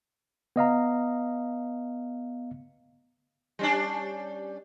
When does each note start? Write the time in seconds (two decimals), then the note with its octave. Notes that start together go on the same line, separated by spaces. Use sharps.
0.56 B3 D#5 F5 A#5
3.59 G3 C#4 D4